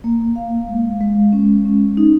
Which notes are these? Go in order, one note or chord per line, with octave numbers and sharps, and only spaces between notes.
A#3
F5
G#3
G#3
C#4
C#4
D#4